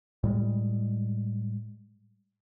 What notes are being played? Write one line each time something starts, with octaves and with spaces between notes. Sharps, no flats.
A2 G3 G#3